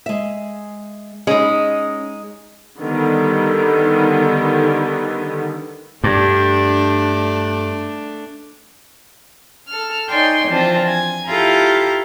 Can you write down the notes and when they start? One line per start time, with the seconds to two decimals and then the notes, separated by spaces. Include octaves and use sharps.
0.06 G#3 E5
1.27 G#3 C#4 D#4
2.79 D3 D#3 G3 B3
6.04 G2 A3 D4
9.67 A4 F6
10.09 D#4 C#5 D5 G5 G#5 C6
10.48 E3 F3 C4 D4 F4
10.87 G#5
11.27 E4 F4 G4 A4 G5 A#5